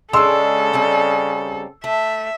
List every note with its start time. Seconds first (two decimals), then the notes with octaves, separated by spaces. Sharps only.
0.13 C#3 G#3 D4 A4 C6 E6
0.73 G3 C4 D#4
1.84 A3 E5